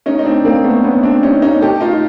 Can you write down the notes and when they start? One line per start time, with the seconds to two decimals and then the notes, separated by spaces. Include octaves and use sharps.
0.06 C#4 D#4
0.19 D#4
0.25 C4 D4
0.45 A#3 C4
0.64 A3 B3
0.84 B3 C#4
1.03 C4 D4
1.23 C#4 D#4
1.42 C#4 D#4
1.61 G4 A4
1.81 D#4 F4
1.93 F4